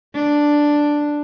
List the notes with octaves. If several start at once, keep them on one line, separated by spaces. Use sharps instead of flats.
D4